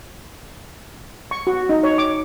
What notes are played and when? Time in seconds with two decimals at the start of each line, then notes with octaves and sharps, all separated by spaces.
1.31 C#6
1.47 F#4
1.69 D#4
1.83 C#5
1.98 D6